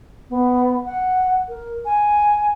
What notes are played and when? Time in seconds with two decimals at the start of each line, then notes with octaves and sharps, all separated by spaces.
0.30 B3
0.85 F#5
1.48 A#4
1.85 G#5